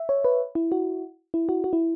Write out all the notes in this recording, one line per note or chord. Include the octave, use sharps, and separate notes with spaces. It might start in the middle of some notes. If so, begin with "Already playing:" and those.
Already playing: E5
C#5
B4
E4
F#4
E4
F#4
F#4
E4